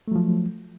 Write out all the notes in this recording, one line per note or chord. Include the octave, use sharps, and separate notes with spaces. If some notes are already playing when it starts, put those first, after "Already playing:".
F3 F#3 A3